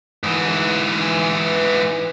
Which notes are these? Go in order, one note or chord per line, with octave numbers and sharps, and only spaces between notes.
G#2 E3